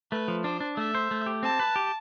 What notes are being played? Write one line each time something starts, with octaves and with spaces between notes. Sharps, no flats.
A3 B4
F3
D4 C5
D4
A3 E5
C5
A3
G4
C4 A5
B4
G4